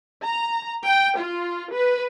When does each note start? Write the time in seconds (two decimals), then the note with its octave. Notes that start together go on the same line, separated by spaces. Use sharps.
0.23 A#5
0.85 G5
1.17 F4
1.73 B4